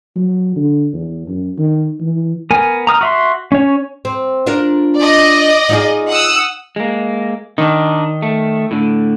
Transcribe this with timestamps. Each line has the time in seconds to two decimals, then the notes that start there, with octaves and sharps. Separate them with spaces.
0.16 F#3
0.56 D3
0.93 E2
1.28 F#2
1.58 D#3
2.01 E3
2.51 B3 A#4 G#5
2.87 A#5 D#6 F6
3.01 F#4 E5 C6
3.52 C#4 C#5
4.05 C4
4.46 D4 F4 A#4
4.97 D5 D#5
5.69 D#4 F4 G#4
6.08 F#5 D#6 E6
6.76 G#3 A#3
7.58 D#3 D4 D#4
8.22 A3
8.71 A2 D3